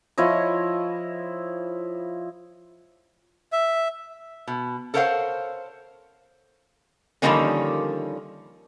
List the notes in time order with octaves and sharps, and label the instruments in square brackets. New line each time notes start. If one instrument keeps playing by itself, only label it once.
[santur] F3 E4 C#5 D#5
[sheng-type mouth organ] E5
[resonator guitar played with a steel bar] B2
A4 A#4 C5 C#5 F5 F#5
D3 D#3 F3 G3 A#3 C#4